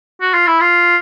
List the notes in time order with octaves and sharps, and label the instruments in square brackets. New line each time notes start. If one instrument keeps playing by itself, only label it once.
[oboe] F#4
F4
E4
F4